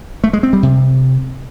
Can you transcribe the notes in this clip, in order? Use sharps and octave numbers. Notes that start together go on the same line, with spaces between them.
A3
G#3
C4
G3
C3